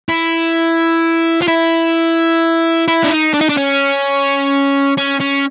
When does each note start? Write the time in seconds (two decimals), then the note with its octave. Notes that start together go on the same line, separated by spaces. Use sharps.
0.09 E4
1.42 F4
1.48 E4
2.88 E4
3.04 D4
3.11 D#4
3.34 D4
3.41 D#4
3.49 D4
3.57 C#4
4.97 C#4
5.20 C#4